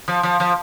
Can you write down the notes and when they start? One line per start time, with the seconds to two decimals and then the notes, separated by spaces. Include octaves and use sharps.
0.08 F3
0.23 F3
0.40 F3